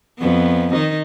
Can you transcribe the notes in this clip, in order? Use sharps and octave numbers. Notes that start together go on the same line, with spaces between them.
F2 B3
D#3 D#4